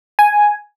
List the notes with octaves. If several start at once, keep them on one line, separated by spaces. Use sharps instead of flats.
G#5